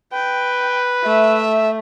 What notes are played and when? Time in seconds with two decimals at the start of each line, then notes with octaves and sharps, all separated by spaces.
0.13 B4 G5
1.04 A3 E5